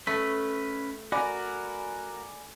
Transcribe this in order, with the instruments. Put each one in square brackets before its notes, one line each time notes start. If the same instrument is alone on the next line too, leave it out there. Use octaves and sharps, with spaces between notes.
[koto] A3 [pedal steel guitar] C#4 B4
[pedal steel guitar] F#4 A#4 [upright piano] D5 G#5 B5